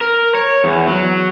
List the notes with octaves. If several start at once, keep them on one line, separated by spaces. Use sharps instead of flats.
A#4
C#5
E2
F#3